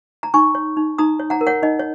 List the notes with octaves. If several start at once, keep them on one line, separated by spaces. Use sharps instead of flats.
A#5
D#4 G#5 C#6
C#5
D#4
D#4 A#5 D#6
C#5
F#5 A#5
A#4
C#5 F#5
D#4 D#5
C#5